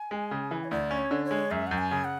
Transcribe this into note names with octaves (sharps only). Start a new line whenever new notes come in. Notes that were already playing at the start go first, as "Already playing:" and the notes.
Already playing: G#5
G#3
C#3
E3
C#5
D2 D5
C#4
C#5
D3
C#5
G#3
F#2 E5
F#2 F#5
G#5
C#3
F#5